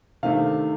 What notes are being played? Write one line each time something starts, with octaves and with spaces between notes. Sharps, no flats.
C3 D#3 A3 D4 F5